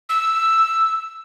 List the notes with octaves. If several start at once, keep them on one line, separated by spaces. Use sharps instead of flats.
E6